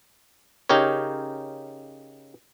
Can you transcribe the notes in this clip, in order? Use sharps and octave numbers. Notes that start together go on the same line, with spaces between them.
C#3 D#4 G4 A#4 C#5